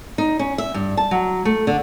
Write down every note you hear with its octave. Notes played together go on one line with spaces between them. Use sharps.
D#4
C#4
E5
G2
A5
F#3
A3
D3